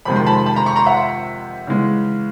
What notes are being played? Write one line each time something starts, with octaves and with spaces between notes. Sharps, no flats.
F2 C3 D#3 G#3 B5
C6
A5 B5
A5 B5
A#5 C6
B5 C#6
A#5 C6
E5 F#5
C#3 E3 G#3